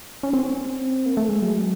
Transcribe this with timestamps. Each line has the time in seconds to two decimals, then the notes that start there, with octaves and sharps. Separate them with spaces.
0.23 C#4
0.33 C4
1.06 A#3
1.17 A3
1.29 G#3
1.42 F#3